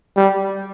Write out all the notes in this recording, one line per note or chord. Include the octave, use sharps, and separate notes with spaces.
G3